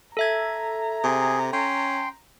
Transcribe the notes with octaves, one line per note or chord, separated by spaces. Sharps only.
A4 E5 A#5 G#6
C3 G#4
C#4 G5 C6